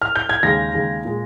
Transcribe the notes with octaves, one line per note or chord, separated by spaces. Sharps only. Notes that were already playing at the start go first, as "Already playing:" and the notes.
F6
G6
G#6
D#2 C#3 G#3 A#6
D#2 C#3 G#3
A#2 G#3